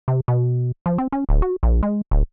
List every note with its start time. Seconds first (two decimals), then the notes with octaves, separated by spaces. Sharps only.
0.08 C3
0.28 B2
0.86 F3
0.98 C4
1.12 C#4
1.29 D1
1.42 F#4
1.63 A#1
1.83 G#3
2.11 D1